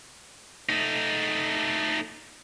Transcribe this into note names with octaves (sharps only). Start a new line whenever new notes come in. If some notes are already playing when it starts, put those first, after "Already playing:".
A3 D#4